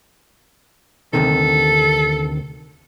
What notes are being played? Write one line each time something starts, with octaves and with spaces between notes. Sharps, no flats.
D2 C3 D#3 A4